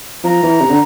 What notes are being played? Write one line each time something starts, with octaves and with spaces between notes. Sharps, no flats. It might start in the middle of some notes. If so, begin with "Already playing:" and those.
F3 A#5
E3
C3
D3